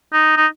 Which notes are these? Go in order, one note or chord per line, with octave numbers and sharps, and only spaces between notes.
D#4
D#4